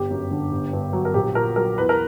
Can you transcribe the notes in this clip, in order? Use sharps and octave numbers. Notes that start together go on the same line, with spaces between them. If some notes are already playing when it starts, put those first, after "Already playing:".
Already playing: G1 G4
F#2
D3
G1
G2
F#3
A#4
A#1 G4
A#2 A#4
F#3 A#4
E2 B4
A#4